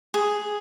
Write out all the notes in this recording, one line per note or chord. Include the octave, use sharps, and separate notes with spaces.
G#4